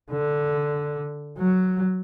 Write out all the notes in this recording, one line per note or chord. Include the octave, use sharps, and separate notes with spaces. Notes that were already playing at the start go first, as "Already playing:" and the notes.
D3
F#3